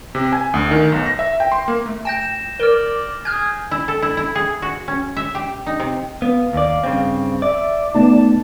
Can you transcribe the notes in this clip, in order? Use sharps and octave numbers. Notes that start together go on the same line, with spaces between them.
C3
G#5
D2
D#3
B1
A#6
E5
G5
C6
A#3
A3
G5 G6 A#6 E7
E7
A#4 D5 F6 G7
G#4 G#5 F6 G6
E4
A4
E4
E4
G#4
F#4
C#4
E5
G4
D#4
C3
B3 F5
D#2 D5
G2 C#3 C4
D5 E5
A3 B3 D#4 A5